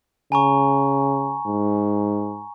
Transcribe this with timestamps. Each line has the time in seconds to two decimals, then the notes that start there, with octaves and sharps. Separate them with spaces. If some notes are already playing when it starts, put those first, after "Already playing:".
0.32 C#3 G#5 A#5 C#6
1.46 G#2